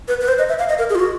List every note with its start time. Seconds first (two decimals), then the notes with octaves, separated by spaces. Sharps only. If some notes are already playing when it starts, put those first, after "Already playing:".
0.08 B4
0.21 B4
0.28 C5
0.38 D#5
0.49 E5
0.59 F5
0.69 D#5
0.79 A#4
0.90 G#4
0.95 F4
0.99 F#4